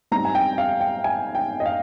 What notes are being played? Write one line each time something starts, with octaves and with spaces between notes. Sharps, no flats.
G#2 G3 C4 D#4 A#5
G#5
G5
F5
G5
G#5
G5
D#5
F5